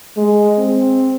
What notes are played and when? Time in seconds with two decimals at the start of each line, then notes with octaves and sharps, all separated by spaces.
0.17 G#3
0.58 C4